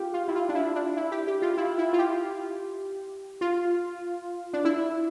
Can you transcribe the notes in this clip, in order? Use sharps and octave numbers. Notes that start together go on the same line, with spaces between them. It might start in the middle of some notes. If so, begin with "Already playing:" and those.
Already playing: F4 G4
F4
E4
F4
D4
E4
D4
E4
G4
G4
F4
E4
E4
F4
G4
F4
D4
E4